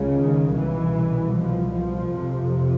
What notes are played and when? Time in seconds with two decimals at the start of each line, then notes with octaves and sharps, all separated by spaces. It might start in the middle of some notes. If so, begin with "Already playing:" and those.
Already playing: C#2 C#3
0.14 D#3
0.53 C2 B2 E3
1.33 F3
1.72 F3
2.12 F2 C3